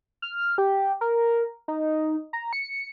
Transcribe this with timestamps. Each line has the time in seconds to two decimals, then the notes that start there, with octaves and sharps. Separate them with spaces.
0.22 F6
0.58 G4
1.01 A#4
1.68 D#4
2.33 A#5
2.53 C#7